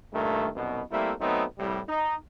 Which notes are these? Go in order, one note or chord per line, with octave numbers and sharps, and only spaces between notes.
G2 A#2 D#3 A3
C2 F#2 B2
G3 A3 A#3 C4 E4
F#3 A3 B3 C4 D#4
C2 A2 G3
D#4